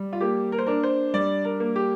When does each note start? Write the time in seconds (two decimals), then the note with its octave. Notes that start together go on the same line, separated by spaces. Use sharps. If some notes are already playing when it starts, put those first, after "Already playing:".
Already playing: G3
0.13 F4
0.21 A#3 G4
0.52 A#4
0.58 C5
0.67 D4 A#4
0.83 C5
1.14 G3 D5
1.45 A#4
1.60 A#3
1.76 G4